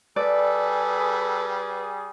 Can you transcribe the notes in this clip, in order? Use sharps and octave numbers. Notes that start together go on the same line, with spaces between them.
G3 G#4 A4 B4 D5